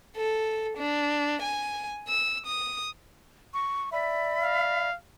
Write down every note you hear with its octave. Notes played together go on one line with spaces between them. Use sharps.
A4
D4
G#5
E6
D#6
C#6
D5 E5 B5
F5